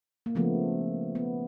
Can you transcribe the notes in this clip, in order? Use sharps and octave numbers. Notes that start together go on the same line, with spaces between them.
A#3
C#3 F3 A3 B3
B3